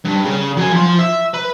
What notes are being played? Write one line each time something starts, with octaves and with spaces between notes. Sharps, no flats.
G2
C#3
F#3 G#5
F3 C6
E5
B4